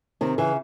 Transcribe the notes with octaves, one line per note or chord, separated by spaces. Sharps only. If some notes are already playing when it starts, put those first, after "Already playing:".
C3 D#3
C#3 E3